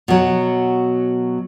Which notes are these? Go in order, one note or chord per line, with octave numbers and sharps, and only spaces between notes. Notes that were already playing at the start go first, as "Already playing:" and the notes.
B2 F#3